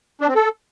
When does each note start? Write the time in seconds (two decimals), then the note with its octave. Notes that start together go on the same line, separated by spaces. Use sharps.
0.21 D4
0.28 C4
0.35 A4